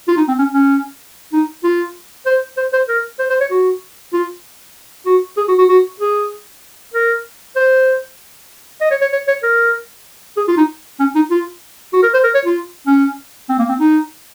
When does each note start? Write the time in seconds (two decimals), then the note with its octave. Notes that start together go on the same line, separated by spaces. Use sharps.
0.08 F4
0.17 D#4
0.28 C4
0.39 C#4
0.54 C#4
1.33 D#4
1.64 F4
2.26 C5
2.57 C5
2.73 C5
2.89 A#4
3.19 C5
3.30 C5
3.41 C#5
3.51 F#4
4.13 F4
5.06 F#4
5.37 G#4
5.48 F#4
5.58 F#4
5.69 F#4
6.00 G#4
6.94 A#4
7.56 C5
8.81 D#5
8.91 C#5
9.01 C#5
9.13 C#5
9.28 C#5
9.43 A#4
10.37 G#4
10.48 F4
10.57 D#4
11.00 C#4
11.15 D#4
11.31 F4
11.93 F#4
12.03 A#4
12.14 C5
12.24 A#4
12.35 C#5
12.45 F4
12.87 C#4
13.49 C4
13.59 A#3
13.69 C4
13.79 D#4